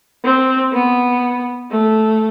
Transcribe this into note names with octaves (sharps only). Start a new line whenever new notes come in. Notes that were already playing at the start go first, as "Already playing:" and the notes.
C4
B3
A3